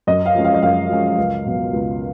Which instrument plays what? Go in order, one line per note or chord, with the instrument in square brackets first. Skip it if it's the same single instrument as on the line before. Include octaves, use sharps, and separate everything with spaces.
[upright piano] F#2 D#5
F5
F3 G#3 C#4
F5
D#5
F#2 F5
F3 G#3 C#4
C#2
B2 F#3
C#2